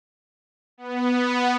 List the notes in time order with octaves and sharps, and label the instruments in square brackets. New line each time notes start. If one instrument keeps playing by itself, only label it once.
[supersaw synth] B3